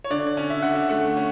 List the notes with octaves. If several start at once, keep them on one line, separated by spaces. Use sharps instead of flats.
C#5
D3 D5
C#4
E5
D3 F#5
E5
A3 F#5
C#4